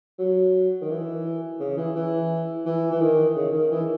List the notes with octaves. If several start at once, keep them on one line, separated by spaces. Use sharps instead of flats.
F#3
D#3
E3
C#3
E3
E3
E3
E3
D#3
C#3
D#3
E3